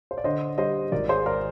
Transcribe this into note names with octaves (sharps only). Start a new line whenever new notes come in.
C5
D5
D3 C5 D#5
G3 C5 D#5
G#1 A#4 D5
G#4 C5
G#3 A#4 D5